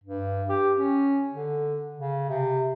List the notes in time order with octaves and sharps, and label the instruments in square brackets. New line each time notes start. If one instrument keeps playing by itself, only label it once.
[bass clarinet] G2
G4
C#4
D3
C#3
C3